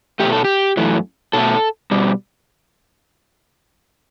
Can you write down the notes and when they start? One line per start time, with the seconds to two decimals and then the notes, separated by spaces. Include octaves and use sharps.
0.20 B2 A3 G4
0.32 A4
0.44 G4
0.77 F#2 E3 A3
1.33 B2 A3 A4
1.91 B2 G3